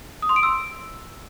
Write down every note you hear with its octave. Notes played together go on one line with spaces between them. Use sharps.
D#6
C6
D7
E6